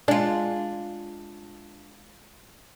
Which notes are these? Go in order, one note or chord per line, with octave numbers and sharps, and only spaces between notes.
G#3 D4 F4